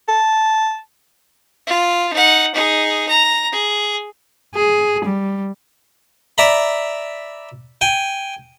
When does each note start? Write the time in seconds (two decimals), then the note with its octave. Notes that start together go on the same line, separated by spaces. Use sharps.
0.08 A5
1.66 F4
2.13 D#4 F#5
2.54 D#4 G#4
3.09 A#5
3.52 G#4
4.55 G#4
5.05 G3
6.38 D5 E5 A#5 B5
7.81 G5 G#5